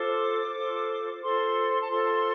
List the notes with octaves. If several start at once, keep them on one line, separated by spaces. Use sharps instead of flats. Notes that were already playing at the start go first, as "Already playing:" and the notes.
Already playing: F4 A4 C5 D6
F4 A4 C5
F4 A4 C5 C6
A5
F4 A4 C5 C6